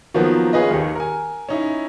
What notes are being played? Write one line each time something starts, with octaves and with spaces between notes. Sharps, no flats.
D#3 F3 F#3 A#3 B3
C#4 F4 G#4 B4 D#5
D#2 D#3
A#4 G#5
C#4 D#4 E4